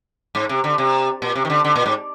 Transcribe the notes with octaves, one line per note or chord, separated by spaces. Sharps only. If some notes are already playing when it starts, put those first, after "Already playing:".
G#2
C3
D3
C3
A#2
C3
D#3
D3
D3
A#2
G#2